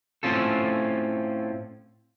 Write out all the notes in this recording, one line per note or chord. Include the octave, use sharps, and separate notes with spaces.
A2 C4 C#4 F4 A4